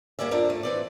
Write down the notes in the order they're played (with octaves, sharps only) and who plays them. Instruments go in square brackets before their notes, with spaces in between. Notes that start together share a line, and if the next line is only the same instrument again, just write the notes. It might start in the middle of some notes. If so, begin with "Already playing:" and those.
[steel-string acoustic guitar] G3 A#3 C#4 D5 E5
F2 F3 D4 A#4 E5
A3
E3 C4 D5